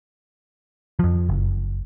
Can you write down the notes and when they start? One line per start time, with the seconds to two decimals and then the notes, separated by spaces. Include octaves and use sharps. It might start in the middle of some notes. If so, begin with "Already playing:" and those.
0.99 F2 F3
1.29 F#1